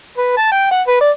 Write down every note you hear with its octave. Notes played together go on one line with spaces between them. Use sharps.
B4
A5
G5
F#5
B4
D5